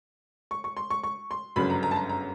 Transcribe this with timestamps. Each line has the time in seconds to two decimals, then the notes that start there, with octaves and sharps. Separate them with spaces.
0.51 C#6
0.64 C#6
0.77 C6
0.90 C#6
1.03 C#6
1.31 C6
1.56 G1 F#2 C#3 B5
1.70 A#5
1.83 A#5
1.91 A5
1.96 A#5
2.09 A#5